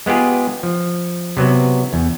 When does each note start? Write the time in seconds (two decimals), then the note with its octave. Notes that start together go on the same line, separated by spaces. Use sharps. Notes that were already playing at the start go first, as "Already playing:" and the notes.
0.06 G#3 B3 F4 G4 G#4
0.63 F3
1.37 C3 F#3 B3
1.93 E2